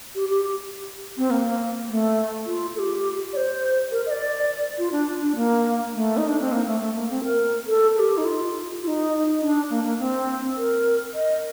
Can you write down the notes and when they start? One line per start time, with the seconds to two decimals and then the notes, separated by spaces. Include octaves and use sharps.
0.15 G4
0.30 G4
1.17 C4
1.30 A#3
1.89 A3
2.46 F4
2.76 A4
2.79 G4
3.33 D5
3.36 C5
3.92 A#4
4.06 D#5
4.11 D5
4.78 F4
4.92 D4
5.22 D4
5.36 A#3
5.94 A3
6.17 D#4
6.28 D4
6.40 C4
6.52 A#3
6.66 A3
6.80 A3
6.95 A#3
7.10 C4
7.24 A#4
7.67 A4
7.96 A4
7.99 G4
8.18 D#4
8.25 F4
8.83 F4
8.87 D#4
9.42 D4
9.70 A#3
9.84 A#3
9.99 C4
10.57 A#4
11.14 D#5